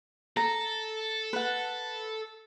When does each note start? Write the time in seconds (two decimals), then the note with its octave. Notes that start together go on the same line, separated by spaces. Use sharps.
0.37 A4 A#5
1.33 B4 F#5